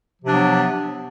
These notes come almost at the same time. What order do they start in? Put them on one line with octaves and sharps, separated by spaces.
F3 C3 D4 F#3 B3